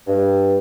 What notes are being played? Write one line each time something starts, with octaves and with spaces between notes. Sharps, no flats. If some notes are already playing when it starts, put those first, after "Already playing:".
G2